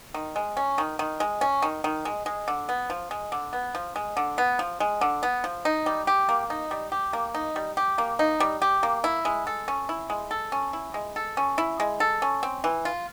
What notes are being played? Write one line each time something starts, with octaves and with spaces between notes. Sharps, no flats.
D#3
G#3
C#4
D#3
D#3
G#3
C#4
D#3
D#3
G#3
G#3
D3
B3
F3
G#3
D3
B3
F3
G#3
D3
B3
F3
G#3
D3
B3
F3
D#4
G3
G4
A#3
D#4
G3
G4
A#3
D#4
G3
G4
A#3
D#4
G3
G4
A#3
E4
G#3
A4
C#4
E4
G#3
A4
C#4
E4
G#3
A4
C#4
E4
G#3
A4
C#4
C4
E3
F4